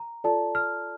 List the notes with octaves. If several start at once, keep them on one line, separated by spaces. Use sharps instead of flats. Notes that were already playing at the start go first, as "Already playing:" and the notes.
Already playing: A#5
F4 A4 D5 A5
F6